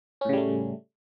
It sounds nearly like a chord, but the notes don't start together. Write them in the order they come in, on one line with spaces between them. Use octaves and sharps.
C#4 A2 C#3 G3 A3